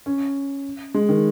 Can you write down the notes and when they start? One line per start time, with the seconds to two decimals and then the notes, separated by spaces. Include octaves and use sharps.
0.06 C#4
0.94 G#3
1.09 D#3